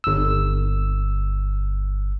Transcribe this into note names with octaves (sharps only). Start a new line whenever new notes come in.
G1 E6